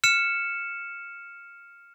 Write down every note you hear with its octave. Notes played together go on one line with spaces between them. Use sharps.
F6 C#7 E7